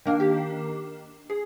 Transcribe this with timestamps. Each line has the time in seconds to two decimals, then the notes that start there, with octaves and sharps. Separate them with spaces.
0.06 D#3 A#3 D4 A#4
0.20 G4
1.30 G#4